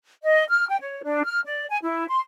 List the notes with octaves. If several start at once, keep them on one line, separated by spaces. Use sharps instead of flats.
D#5
F6
G5
C#5
D4
F6
D5
G#5
E4
C6